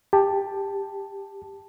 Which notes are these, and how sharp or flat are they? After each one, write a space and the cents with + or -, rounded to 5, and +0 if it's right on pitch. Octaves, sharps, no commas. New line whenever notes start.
G4 +15 A5 +0